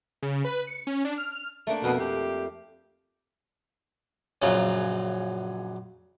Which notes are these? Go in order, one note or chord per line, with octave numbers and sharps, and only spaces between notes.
C#3
B4
C#7
C#4
D4
F6
A3 A#3 D4
F2 B2
G4
A#1 F#2 C#3 F#3 F4